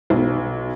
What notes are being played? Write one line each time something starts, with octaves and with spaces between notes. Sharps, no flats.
B1